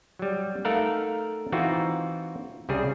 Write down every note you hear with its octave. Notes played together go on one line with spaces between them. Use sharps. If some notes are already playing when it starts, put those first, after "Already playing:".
F#3 G3
A3 D#4 A4 A#4 F5 F#5
E3 C4 D#4 F4 F#4
C2 C#3 G3 G#4